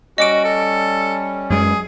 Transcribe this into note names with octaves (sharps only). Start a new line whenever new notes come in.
G3 C#4 F#4 D#5 D6 D7
A4
F#2 G#3 G#4